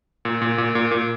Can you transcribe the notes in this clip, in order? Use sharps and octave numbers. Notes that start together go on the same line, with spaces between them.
A#2
A#2
A#2
A#2
A#2